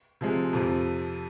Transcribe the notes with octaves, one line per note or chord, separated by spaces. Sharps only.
C3 F3 G#3
F2 C3 F3